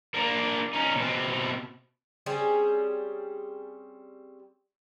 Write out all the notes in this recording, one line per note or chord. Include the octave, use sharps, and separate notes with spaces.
A#3 D4
C#4 D#4
B2 C4
G3 C4 C#4 G#4